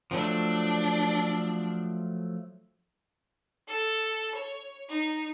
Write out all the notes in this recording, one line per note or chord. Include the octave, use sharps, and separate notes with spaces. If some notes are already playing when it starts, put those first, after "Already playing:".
F3 F#3 A3 D4
A4
C#5
D#4